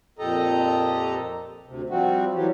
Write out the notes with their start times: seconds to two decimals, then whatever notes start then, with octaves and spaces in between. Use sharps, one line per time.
0.19 F2 A#2 G4 A4 D#5 A#5
1.66 D2 C3
1.90 F3 G3 C4 F#4
2.34 E3 F#3 G3 G4